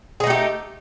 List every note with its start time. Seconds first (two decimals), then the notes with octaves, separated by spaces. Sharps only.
0.20 G#4
0.24 D#4
0.27 A3
0.30 G4